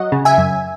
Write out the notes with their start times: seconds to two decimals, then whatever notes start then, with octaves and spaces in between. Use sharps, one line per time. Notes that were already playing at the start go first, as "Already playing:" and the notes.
Already playing: F#3 D#5 F#5
0.12 C#3
0.25 E5 G#5
0.38 F#2